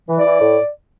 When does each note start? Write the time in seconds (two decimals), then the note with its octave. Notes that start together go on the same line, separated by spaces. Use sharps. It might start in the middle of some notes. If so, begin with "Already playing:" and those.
0.09 E3
0.18 D5
0.25 E3
0.41 A2